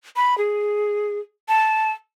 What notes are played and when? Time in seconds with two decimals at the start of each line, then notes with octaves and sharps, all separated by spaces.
0.16 B5
0.38 G#4
1.49 A5